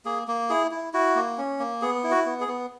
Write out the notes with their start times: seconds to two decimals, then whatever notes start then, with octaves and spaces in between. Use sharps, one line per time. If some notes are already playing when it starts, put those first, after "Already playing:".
0.05 A#3 G#4
0.28 A#3
0.49 E4 G#4
0.71 E4
0.93 E4 F#4
1.16 A#3
1.38 C#4
1.59 A#3
1.82 B3 G#4
2.04 E4
2.11 F#4
2.26 B3
2.41 G#4
2.48 B3